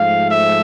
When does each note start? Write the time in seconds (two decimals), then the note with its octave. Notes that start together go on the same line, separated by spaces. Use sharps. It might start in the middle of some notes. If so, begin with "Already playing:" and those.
Already playing: G#2 F3 A3 F5
0.29 E5